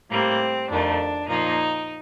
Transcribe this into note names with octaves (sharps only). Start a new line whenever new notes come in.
A2 G3 A#3 C4
F2 D#3 A3 D4
A#2 F3 A#3 D#4